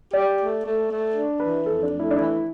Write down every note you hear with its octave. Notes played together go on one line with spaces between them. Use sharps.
G4 D5
A3
A3
A3
D4
E3 B4
F2 A4
D4
A3
E4
D4
E3 E4